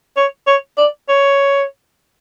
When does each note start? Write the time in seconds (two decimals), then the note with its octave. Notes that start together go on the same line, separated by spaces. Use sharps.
0.17 C#5
0.47 C#5
0.78 D5
1.09 C#5